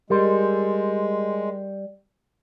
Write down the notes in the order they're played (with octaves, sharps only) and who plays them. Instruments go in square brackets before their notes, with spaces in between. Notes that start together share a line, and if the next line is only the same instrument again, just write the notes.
[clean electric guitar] G3 [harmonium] G#3 [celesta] G4 A#4 C6